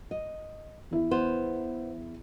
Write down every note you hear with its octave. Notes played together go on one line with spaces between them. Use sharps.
D#5
E2 E4
B3 C5